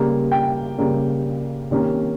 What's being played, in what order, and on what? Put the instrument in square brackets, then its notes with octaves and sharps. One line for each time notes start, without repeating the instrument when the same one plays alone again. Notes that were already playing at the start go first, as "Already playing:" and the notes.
Already playing: [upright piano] C#3 G3 A#3
G5
C#3 G3 A#3
C3 D#3 A#3 C#4